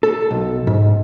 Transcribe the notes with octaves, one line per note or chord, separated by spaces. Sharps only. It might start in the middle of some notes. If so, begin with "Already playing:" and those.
A4
B1
G#2